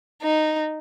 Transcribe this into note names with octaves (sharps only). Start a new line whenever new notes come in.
D#4